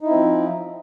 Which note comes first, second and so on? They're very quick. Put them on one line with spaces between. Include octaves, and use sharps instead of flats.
D#4 E4 C4 F3